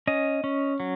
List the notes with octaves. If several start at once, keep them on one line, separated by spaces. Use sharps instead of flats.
C#4 D#5
C#4
F#3